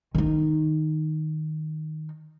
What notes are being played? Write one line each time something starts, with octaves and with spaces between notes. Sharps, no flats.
D#3 D#4